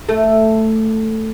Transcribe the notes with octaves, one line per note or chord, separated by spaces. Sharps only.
A3